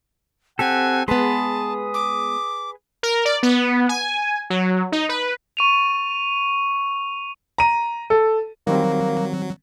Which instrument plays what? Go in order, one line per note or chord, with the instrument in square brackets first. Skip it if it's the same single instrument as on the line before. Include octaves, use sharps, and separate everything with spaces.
[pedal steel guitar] C4 G4 A4 [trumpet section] F#5 [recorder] G#5
[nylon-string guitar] G#3 B3 [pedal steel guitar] G#4 B4 C6 [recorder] A5 [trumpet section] D#6
[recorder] D6
[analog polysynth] A#4
D5
B3
G#5
F#3
D#4
B4
[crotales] C#6 D#7 F7
[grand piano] A#5 D#7
A4
[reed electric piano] D#3 G3 C4 [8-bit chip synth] F#3 [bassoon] A#3